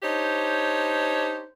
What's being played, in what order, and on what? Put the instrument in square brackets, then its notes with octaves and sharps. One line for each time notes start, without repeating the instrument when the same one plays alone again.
[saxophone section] D4 D#4 G4 C5 C#5